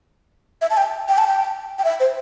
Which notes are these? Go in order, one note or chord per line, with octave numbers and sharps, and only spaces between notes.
E5
A5
G5
G5
A5
G5
G5
E5
C5